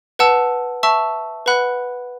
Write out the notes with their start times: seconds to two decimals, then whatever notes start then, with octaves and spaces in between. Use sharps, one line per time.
0.19 B4 F#5 A5 E6
0.83 E5 A5 C#6 E6
1.46 B4 F#5 B5 F#6